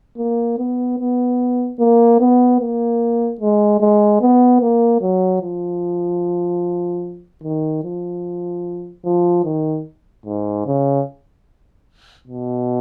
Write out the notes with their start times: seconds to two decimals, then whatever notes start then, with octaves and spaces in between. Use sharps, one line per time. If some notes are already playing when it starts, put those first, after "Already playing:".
0.18 A#3
0.58 B3
0.99 B3
1.79 A#3
2.20 B3
2.60 A#3
3.41 G#3
3.81 G#3
4.21 B3
4.61 A#3
5.01 F#3
5.42 F3
7.44 D#3
7.84 F3
9.05 F3
9.45 D#3
10.26 G#2
10.66 C#3
12.27 B2